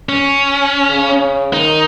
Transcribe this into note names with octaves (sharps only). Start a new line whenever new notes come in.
C#4
C#3
D#3 D#4